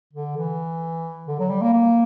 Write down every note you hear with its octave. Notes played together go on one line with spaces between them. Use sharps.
D3
E3
D3
F#3
G3
A#3
A#3